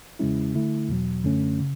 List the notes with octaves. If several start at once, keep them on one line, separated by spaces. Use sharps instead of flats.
E2 C#3 G#3 C#4 E4
D3 A3 E4
E2 B2 F#3
F#2 D3 A3 C#4
C#3